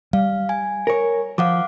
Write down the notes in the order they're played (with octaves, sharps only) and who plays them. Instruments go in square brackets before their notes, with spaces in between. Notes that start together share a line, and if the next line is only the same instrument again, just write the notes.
[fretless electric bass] G3 [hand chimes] F5
[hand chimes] G#5
[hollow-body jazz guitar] A#4 C#5
[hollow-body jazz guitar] F3 [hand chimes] F5 F#5 D6